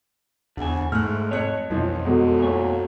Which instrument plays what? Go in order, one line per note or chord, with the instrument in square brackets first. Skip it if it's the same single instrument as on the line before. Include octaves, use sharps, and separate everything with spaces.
[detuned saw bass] E2 [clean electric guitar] D3 G#5
[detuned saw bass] G#2 [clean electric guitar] A3 [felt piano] F6 F#6
[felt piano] F2 F#6 C#7 [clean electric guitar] C#5
[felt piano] B1 E3 F3 [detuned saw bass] F2
[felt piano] E2 B2 G#3 [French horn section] F#4 A4
[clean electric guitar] A#2 C#5